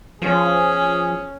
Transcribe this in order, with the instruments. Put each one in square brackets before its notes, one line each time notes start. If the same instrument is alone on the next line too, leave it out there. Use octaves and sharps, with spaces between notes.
[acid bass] F3 [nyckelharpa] C#4 [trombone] G#4